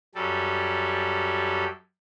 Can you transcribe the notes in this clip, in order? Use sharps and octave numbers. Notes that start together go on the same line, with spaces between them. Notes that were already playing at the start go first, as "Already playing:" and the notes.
F#2 G3 A4